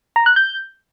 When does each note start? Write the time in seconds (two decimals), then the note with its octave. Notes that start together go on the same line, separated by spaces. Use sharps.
0.16 A#5
0.26 F#6
0.36 G6